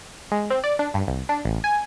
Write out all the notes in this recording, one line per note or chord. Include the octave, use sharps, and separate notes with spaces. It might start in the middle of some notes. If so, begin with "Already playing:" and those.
G#3
C4
D5
D4
G2
C2
D4
A1
G#5